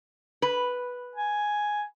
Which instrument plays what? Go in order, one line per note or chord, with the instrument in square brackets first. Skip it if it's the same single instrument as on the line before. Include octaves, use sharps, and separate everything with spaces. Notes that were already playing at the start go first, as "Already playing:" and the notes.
[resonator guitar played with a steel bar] B4
[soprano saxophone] G#5